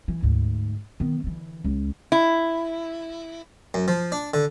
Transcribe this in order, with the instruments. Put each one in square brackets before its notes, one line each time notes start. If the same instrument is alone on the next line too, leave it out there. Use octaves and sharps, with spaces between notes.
[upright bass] E3
D2 G#2
D#3 B3
D3 E3
C#2
[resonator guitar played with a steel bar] E4
[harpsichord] F#2
F3
D4
D3